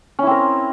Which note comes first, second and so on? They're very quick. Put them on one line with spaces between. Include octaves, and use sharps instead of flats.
C#4 E4 C4 A#4